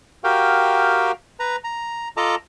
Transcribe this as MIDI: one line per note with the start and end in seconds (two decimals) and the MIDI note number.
0.24 1.12 66
0.24 1.12 67
0.24 1.12 70
0.24 1.12 77
0.24 1.12 79
1.40 1.56 71
1.40 1.56 82
1.64 2.09 82
2.17 2.35 65
2.17 2.35 69
2.17 2.35 75
2.17 2.35 81
2.17 2.35 82
2.17 2.35 86